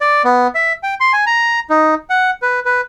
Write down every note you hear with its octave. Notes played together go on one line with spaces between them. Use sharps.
D5
B3
E5
G5
C6
G#5
A#5
D#4
F#5
B4
B4